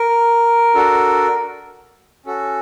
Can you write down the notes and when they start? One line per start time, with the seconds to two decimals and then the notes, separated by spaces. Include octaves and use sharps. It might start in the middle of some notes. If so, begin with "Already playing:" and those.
Already playing: A#4
0.75 D4 F#4 A4
2.26 C#4 F#4 A4